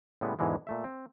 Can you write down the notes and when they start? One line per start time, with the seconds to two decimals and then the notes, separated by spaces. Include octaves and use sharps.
0.21 A2 C#3 G3 G#3 B3
0.39 E2 G#2 B2 D3 E3 G#3
0.67 A#2 A3 E5
0.84 C4